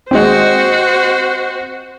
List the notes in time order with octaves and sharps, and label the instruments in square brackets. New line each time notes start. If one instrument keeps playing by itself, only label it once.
[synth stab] D#2 G#3 [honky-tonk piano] C4 D#5 [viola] F#4 C5